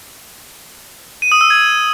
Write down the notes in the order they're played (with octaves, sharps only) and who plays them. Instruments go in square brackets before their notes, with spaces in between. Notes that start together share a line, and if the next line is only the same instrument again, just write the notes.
[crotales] D#7
D#6
E6
G#6